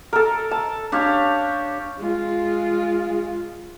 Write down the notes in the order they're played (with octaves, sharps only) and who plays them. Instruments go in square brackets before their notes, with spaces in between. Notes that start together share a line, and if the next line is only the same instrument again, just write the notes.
[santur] A4 A#4
A5
[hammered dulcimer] D4 G4 C#5 F5
[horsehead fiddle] G#3 F4